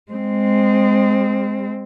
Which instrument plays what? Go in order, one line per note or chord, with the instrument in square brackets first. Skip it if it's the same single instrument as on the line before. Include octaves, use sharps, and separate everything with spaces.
[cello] G#3 C4